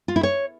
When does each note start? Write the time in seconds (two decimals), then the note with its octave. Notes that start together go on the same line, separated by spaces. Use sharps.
0.08 F4
0.16 E4
0.23 C#5